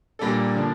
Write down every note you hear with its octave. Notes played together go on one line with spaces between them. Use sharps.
A#2 G3 A#3 D4 A4
D3 F3 A#3 D4